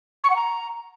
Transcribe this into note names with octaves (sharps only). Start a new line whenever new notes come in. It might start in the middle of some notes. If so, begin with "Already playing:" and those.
C#6
F#5
A#5